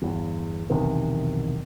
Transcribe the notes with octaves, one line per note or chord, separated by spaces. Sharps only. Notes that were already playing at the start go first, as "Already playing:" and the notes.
G1 E2
B1 E2 C3 D#3